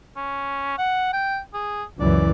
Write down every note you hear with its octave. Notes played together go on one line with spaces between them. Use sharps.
C#4
F#5
G5
G#4
C#2 F#2 E3 D5